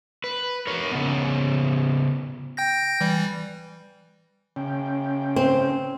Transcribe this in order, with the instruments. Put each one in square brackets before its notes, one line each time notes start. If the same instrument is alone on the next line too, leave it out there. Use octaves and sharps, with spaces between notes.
[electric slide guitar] B4
A#4 C#5
C#3 B3
[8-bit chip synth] G5 G6 A#6
E3 G3
[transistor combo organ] C#3 C#4 G5
[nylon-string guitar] C4